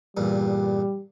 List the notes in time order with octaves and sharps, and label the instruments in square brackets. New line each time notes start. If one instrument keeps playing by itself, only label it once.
[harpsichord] E2 G2 A#2 [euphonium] G3